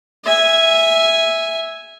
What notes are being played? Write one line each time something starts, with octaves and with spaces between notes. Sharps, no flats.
E5 G#5